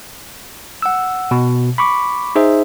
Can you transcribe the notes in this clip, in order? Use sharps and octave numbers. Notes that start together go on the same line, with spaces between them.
F#5 E6
B2
B5 C#6 D6
D#4 G#4 C5 E5